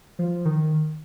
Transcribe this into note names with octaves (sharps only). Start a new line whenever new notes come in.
F3
D#3